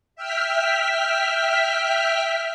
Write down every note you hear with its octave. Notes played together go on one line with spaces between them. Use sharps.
E5 G5 F6 B6